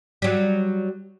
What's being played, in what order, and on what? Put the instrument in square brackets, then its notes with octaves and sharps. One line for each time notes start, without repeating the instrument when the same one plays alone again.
[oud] F#3 G3